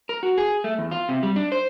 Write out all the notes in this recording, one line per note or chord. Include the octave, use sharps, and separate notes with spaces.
A#4
F#4
G#4
A3
E2
F4
C3
G3
D4
C5